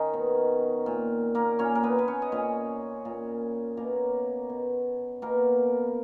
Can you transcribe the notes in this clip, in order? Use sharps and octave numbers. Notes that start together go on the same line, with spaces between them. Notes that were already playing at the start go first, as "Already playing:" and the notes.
Already playing: D#3 C#4 D#4
B2
A#2
A#3 A#4
A#2 C#4 C#5
A#4
B3 B4
B4
C#4 C#5
D#5
A#2 C#4 C#5
A#2
B2 A#3 A#4
B2
B2 A#3 A#4